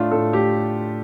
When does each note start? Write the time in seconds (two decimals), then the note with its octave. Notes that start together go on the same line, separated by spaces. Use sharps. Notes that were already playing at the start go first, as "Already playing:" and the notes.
Already playing: A2 A3 D4 F4
0.11 A2 A4
0.33 A3 G4